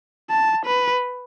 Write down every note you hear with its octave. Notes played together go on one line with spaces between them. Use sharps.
A5
B4